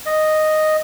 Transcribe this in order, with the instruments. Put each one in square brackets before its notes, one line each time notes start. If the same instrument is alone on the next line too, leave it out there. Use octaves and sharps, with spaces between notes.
[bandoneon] D#5